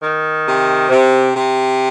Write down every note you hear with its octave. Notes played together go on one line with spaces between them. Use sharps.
D#3
C3
C3
C3